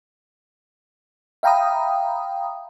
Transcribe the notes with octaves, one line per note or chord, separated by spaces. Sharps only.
E5 F5 G5 A#5 B5 D#6